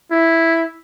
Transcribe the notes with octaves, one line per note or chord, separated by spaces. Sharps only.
E4